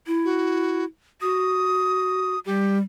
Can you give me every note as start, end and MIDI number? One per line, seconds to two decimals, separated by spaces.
0.07 0.85 64
0.25 0.85 66
1.21 2.35 66
1.21 2.39 87
2.46 2.81 55
2.46 2.78 67